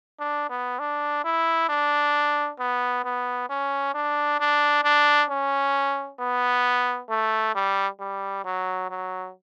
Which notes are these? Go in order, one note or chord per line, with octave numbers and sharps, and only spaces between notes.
D4
B3
D4
E4
D4
B3
B3
C#4
D4
D4
D4
C#4
B3
A3
G3
G3
F#3
F#3